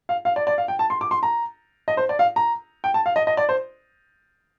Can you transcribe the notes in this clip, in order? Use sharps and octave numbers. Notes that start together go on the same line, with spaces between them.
F5
F5
D5
D5
F5
G5
A5
C6
D6
C6
A#5
D#5
C5
D5
F5
A#5
G5
A5
F5
D#5
D#5
D5
C5